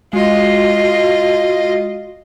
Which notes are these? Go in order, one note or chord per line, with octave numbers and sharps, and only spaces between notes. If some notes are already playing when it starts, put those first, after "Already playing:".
G#3 F4 F#4 D#5